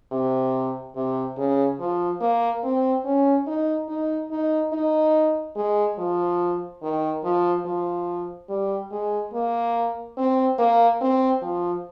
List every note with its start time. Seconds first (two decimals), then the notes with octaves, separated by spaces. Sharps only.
0.12 C3
0.96 C3
1.37 C#3
1.80 F3
2.21 A#3
2.64 C4
3.05 C#4
3.47 D#4
3.89 D#4
4.31 D#4
4.73 D#4
5.56 G#3
5.98 F3
6.83 D#3
7.24 F3
7.65 F3
8.49 G3
8.92 G#3
9.33 A#3
10.18 C4
10.58 A#3
11.01 C4
11.42 F3